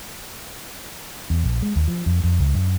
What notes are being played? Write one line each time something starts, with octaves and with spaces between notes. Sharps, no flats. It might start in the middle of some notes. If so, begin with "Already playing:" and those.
E2
A#1
G#3
D#2
F3
F2
F2
C#2
F#2